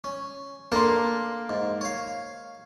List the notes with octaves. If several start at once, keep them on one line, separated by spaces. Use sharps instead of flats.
C#4
A#3 D4 A4 A#4 C6
G#2
C#5 F5